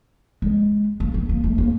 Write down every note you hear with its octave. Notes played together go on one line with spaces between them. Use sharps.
G#3
A#3
B3
A#3
A3
A#3